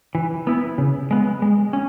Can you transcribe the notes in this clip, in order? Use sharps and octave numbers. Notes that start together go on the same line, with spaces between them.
E3
B3 E4
C#3
G#3 B3
G#3
C#4